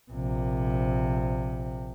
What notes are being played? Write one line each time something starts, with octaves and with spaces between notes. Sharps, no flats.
A#1 C3